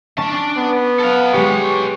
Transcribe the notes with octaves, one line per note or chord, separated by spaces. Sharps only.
C#4 D4 A5
B3
A4 F5
G#3 G4 B4 C#5